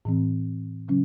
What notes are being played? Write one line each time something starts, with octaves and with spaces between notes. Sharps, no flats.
A2 E3 C4
C#3 F#3 C#4